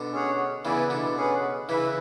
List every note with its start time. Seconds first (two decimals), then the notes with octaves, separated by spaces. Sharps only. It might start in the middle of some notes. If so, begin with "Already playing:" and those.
Already playing: B2 D3
0.13 C#4 G#4 C#5 F#5
0.65 C#3 E3 B3 E4 B4 D5 G#5
0.90 B2 D3
1.17 C#4 G#4 B4 F#5
1.69 C#3 E3 E4 B4 E5